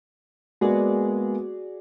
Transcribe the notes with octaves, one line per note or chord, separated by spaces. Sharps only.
G#3 A#3 B3 F#4 G#4 D5